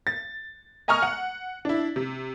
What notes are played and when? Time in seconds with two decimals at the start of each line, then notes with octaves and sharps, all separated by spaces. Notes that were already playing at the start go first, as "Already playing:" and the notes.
0.07 A6
0.88 D#5 G#5 A#5 C#6 D#6 F6
1.02 F#5
1.65 D4 E4
1.96 C3